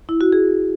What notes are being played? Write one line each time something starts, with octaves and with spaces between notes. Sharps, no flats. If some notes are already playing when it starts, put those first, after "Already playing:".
E4
F#4
G#4